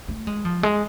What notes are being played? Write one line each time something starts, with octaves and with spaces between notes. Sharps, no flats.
A3
G#3
F3
G#3